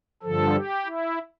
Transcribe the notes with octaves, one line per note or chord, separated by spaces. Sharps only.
G2 D3 F3 A4
G4
E4